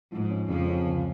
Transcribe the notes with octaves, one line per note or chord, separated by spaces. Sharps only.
G#2 F3
C#4
F2 C#3 F3
C#4
C#2